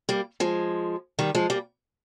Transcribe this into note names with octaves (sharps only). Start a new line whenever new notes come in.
G3 A#3
F3 G#3
D#3 G3
F3 G#3
G3 A#3